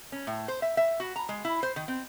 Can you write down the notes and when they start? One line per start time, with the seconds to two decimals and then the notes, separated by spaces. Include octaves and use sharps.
0.12 C#4
0.27 A2
0.48 C5
0.62 E5
0.77 E5
1.00 F#4
1.16 A#5
1.29 G#3
1.45 E4
1.63 C5
1.76 D#3
1.88 C4